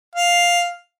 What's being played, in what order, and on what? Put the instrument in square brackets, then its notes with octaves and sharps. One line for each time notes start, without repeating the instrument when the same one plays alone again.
[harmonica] F5